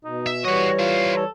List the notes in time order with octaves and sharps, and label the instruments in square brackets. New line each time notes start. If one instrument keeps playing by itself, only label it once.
[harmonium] B2 [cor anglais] D#4
[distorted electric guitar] E5
[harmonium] E3 G3 C#5 [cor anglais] F#4 [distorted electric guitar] D#5 F#5
[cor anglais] F4 [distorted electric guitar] A#4 C5
[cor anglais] A4